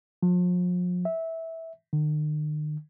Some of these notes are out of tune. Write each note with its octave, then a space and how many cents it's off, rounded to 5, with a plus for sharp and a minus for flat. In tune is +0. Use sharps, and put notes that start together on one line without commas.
F3 +40
E5 -15
D#3 -45